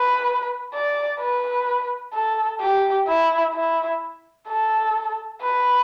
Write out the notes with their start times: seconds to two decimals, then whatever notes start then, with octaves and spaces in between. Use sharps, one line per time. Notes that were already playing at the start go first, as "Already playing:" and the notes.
Already playing: B4
0.74 D5
1.20 B4
2.14 A4
2.60 G4
3.08 E4
3.54 E4
4.48 A4
5.41 B4